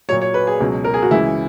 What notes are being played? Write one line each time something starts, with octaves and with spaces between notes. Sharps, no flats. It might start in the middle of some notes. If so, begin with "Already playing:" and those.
A#2 F#3 C#5
C#5
B4
G#4
C#2 B2 F#3
A#4
G#4
F#4
C#2 C#3 E3 G#3 E4